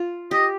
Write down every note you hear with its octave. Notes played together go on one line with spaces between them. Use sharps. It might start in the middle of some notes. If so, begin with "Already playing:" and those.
Already playing: F4
G4 D#5